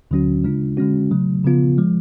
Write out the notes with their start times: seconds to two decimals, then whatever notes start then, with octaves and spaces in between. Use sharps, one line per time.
0.11 D2 D3 F#3 C#4 F#4
0.44 C#3 G#3 D4 F4
0.77 D3 G#3 C#4 F#4
1.11 C#3 F#3 A3
1.44 C#3 F3 B3 F4
1.78 F3 G#3